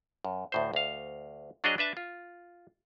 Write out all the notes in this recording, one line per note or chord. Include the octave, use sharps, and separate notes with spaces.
F#2
D2 A2 C5
D2 F5
F#3 D4 F#4 G#4 C#5 D#5
D4 B4 E5 A5
F4